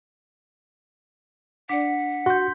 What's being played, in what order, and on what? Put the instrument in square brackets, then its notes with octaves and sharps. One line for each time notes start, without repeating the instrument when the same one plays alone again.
[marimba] D4 D5 [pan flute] F#5 [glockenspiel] B6
[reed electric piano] F#4 [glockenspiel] C6 G6